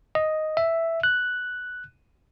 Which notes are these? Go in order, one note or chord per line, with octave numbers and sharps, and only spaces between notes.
D#5
E5
F#6